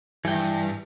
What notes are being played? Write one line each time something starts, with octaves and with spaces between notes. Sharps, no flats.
G2 E3 G5